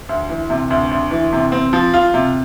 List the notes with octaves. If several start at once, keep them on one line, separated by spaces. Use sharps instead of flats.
D2
E3
C3
D2
D2
E3
C3
C4
F3
F4
C3